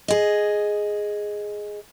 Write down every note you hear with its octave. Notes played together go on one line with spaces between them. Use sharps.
G#4 D#5